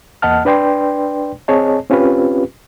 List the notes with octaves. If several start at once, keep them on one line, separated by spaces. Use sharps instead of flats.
E2 A#3 D#5 F#5 A5 F6
D4 B4 D5 G5 C6
C4 G#4 C#5 D#5 A5
C4 C#4 F4 G4 B4